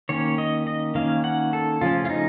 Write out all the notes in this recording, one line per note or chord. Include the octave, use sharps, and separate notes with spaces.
D#3 A#3 C#4 C#5
D#5
D#5
D#3 A#3 C#4 F5
F#5
A4
C#3 F3 A3 C#4 F4
F4
D#4